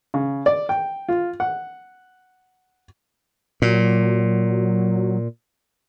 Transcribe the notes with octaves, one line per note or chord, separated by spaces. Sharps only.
C#3
D5
G5
F4
F#5
A#2 F#3